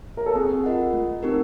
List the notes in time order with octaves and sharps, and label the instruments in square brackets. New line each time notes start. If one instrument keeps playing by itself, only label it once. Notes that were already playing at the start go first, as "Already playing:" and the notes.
[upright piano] A#4
A4
[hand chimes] C4 [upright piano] G#4
[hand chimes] F4 A#4 D#5 F#5
A3
C4 D#4 G4 A#4